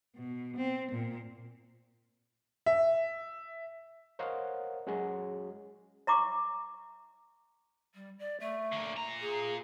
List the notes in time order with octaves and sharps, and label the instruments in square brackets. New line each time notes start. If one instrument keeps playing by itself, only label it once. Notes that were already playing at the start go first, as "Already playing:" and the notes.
[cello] B2
C4
A#2
[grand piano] E5
[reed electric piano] A#4 C5 C#5 D#5 F5 F#5
F#3 G#3 C#4 F#4 G#4 C#5
[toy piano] E5 A#5 C#6 D6
[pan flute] G3
D5
A3
[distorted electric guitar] D3 A#3
A#2 A#5
[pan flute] G#4